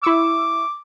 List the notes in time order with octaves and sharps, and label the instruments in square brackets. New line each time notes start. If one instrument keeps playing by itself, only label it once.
[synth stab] E4 C#6 E6 [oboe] D6